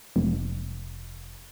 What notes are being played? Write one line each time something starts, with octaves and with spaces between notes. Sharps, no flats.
F1